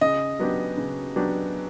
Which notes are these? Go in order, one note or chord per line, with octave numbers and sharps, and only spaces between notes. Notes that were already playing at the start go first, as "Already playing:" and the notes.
C#3 D#5
F#3 B3 D4 G4
C#3
F#3 B3 D4 G4